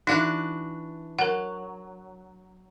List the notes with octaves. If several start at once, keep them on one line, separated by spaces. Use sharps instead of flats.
E3 D4 D#4 F#4 F5
F#3 A#4 F#5